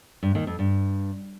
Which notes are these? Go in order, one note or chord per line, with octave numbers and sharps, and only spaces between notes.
G2
D#2 D#3
F2
G2